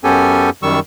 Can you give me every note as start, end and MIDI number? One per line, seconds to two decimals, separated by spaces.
0.04 0.50 42
0.04 0.50 59
0.04 0.50 61
0.04 0.50 67
0.04 0.50 69
0.04 0.50 80
0.63 0.80 42
0.63 0.80 51
0.63 0.80 55
0.63 0.80 85
0.63 0.80 88